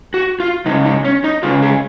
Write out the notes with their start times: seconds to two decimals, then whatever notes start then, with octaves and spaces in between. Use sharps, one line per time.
0.14 F#4
0.40 F4
0.66 C#3 G#3 C#4 D#4
0.85 D#4
1.05 C#4
1.24 D#4
1.43 C#3 G#3 C#4 F4
1.62 G#4